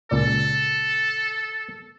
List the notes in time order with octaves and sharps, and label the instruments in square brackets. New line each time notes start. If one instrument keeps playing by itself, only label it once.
[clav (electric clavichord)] C#2 A#2 D5 [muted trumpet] A4